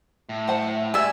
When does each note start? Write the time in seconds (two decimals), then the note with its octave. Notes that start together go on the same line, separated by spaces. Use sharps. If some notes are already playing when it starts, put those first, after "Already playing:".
0.29 A2
0.48 C5 F#5 A5
0.94 D5 E5 G#5